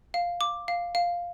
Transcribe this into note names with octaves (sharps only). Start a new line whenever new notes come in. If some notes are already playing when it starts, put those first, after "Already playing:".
F5
D6
F5
F5